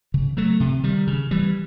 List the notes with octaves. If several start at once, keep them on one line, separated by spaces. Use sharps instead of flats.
C#3
F#3 A3
C3
D#3 G3
C#3
E3 G3